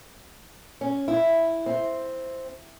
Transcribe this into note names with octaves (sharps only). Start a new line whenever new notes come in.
C#4
E4
C4